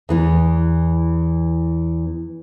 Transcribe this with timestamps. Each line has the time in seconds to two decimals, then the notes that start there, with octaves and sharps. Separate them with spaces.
0.09 E2 E3 B3